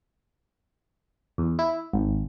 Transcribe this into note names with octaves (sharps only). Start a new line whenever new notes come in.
E2
E4
G#1